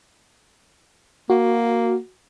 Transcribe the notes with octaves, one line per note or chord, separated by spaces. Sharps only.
A#3 F#4